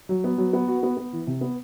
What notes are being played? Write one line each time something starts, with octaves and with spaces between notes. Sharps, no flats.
F#3
B3
F#3
B3
F#4
B3
B3
E3
C3
B3